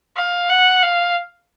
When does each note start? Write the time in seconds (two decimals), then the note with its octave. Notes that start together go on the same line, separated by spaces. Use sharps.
0.17 F5
0.50 F#5
0.82 F5